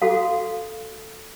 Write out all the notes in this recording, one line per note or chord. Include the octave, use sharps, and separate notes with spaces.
F#4 A4 F5